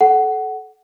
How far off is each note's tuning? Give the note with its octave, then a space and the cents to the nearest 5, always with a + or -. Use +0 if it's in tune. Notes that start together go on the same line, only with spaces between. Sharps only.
A4 -25 F#5 +15